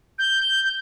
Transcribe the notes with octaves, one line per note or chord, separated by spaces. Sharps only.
G6